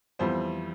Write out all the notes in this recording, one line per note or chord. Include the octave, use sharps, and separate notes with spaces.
F2 E3 G3 B3 C5